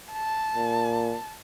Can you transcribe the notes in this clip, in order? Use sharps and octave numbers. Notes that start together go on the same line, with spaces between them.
A5
A#2